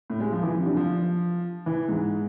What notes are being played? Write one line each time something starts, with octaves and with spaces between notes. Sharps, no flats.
A2
G#3
F3
E3
F3
C3
D3
F3
E3
G#2